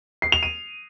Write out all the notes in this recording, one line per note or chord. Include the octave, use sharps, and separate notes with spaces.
C7
F7
D#7